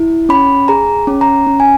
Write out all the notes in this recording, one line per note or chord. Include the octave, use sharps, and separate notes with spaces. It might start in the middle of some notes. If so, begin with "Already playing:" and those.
Already playing: E4
C#4 B5
G#4 A#5
C#4
A#5
C#4
G#5